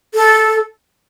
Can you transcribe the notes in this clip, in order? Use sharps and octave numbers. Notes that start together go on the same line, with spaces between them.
A4